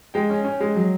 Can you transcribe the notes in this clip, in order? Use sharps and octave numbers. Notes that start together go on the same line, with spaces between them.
G#3 G5
C#4
C#4
G#3
F#3